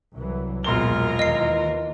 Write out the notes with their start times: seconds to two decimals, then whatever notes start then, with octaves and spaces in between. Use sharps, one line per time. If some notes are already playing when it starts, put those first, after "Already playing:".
0.15 C2 E3 F#3
0.64 E1 A#1 C3 F#3 F4 A#4 C6 G7
1.19 D#2 E3 D#5 C7